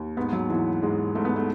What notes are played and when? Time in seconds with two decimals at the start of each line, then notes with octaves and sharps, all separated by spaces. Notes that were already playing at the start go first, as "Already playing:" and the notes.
Already playing: D#2
0.17 G#2 B3
0.33 F#3
0.50 G#2 E3
0.82 G#2 G#3
1.15 G#2 A3
1.25 B3
1.36 A3